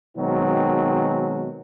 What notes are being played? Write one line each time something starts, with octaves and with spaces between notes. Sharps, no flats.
B2 D#3 F#3 G#3 C4